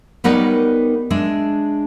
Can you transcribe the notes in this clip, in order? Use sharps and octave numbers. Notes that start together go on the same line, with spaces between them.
G3 B3 D#4 A#4 C#5 D5
G#3 D4 E5